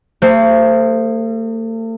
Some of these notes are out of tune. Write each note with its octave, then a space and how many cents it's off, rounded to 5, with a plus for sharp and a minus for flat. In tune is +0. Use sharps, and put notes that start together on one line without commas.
A3 +45 G#4 -15 C5 +0